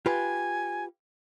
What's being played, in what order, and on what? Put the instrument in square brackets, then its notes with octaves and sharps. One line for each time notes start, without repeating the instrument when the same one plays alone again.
[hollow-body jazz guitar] F4 G4 B4 [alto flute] G#5